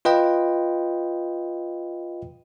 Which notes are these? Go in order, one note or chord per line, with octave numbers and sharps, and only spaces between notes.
F4 B4 D#5 G5